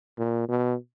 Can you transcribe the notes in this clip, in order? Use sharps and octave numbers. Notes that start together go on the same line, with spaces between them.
A#2
B2